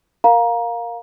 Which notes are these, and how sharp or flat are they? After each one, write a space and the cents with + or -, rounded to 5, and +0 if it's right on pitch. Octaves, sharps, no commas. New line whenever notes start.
A#4 +0 F5 +10 A#5 +20